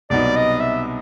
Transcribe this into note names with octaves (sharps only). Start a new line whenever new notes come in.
C2 B2 F#3 B3 D#4 D5
D#5
E5